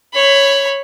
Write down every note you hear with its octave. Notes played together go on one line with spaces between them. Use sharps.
C#5 B5